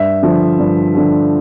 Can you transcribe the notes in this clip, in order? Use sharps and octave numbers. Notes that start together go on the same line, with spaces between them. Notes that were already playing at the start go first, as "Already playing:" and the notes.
Already playing: G2 E5
D3 F3
G2
D3 F3